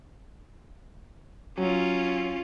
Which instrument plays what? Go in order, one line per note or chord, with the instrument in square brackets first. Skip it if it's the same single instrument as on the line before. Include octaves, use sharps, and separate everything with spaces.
[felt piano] F#3 [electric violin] C#4 F4